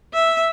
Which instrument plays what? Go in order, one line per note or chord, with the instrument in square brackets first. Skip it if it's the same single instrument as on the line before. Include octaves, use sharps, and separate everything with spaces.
[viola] E5